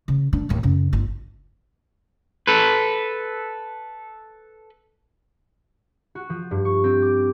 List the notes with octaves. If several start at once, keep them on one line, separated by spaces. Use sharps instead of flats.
C#3
D#3 D4
D#2 A2
F#2 C#3
G1 F4
A4 B4
F#4
F3
G2
C#6
C4
D6